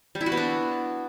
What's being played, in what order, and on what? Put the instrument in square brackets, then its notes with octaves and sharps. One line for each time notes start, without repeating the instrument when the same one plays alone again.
[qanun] G3
E4
F#4
B3
D4